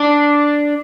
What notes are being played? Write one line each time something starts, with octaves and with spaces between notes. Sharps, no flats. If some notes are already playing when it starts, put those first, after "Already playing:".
Already playing: D4